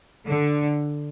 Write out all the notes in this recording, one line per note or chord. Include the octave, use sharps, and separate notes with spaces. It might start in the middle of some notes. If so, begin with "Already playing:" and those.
D3